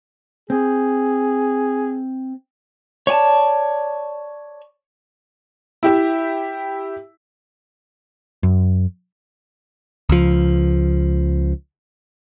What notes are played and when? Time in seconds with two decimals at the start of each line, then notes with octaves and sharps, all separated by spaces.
0.50 C4 G#4
3.07 C#5 D5 G#5 A5
5.83 E4 G4 E5
8.43 F#2
10.09 C#2 F3